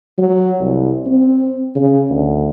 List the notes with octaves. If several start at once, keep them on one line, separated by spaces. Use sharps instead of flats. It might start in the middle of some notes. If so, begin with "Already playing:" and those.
F#3
C2
C4
C#3
D2